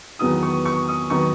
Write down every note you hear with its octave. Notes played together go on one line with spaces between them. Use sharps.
E2 D#3 F#3 B3 D#4 D#6
C#6
C#6
D#6
D#3 F#3 B3 D#4 C#6